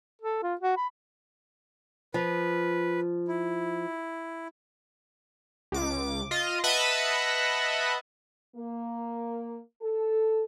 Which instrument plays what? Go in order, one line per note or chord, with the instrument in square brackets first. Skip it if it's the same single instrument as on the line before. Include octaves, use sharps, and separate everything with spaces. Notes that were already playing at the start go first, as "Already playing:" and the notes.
[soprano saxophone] A4
F4
F#4
B5
[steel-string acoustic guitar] F3 [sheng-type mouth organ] B4
[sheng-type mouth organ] E4
[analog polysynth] C#2 D6
F4 D#5
B4 D#5 E5 F#5 A5 B5
[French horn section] A#3
A4